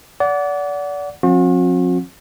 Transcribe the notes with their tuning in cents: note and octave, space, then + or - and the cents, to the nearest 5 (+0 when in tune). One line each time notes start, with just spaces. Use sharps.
D5 -30 F#5 +0
F3 +35 C4 +40 F#4 -45